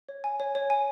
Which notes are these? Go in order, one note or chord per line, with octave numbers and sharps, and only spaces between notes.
C#5
G#5
C#5
C#5
G#5